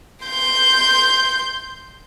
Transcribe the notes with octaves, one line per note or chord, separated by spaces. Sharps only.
C6 G6